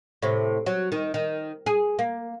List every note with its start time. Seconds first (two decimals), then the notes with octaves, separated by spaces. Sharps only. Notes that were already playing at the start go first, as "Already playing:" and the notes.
0.22 A2 C3
0.66 F#3
0.92 D#3
1.14 D#3
1.66 G#4
1.99 A#3